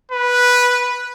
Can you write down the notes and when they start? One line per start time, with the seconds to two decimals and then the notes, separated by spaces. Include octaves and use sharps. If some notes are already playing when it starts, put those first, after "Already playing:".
0.11 B4